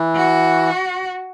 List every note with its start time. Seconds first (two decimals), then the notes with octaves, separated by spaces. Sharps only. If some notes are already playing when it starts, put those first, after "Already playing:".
Already playing: E3
0.16 F#4